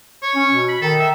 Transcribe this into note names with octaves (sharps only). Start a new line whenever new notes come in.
C#5
C#4
B2
B5
D#3 A4
E5